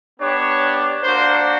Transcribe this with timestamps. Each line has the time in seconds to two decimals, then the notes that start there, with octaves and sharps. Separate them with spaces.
0.19 B3 D4 G4 C#5
1.02 A#3 D4 F#4 C5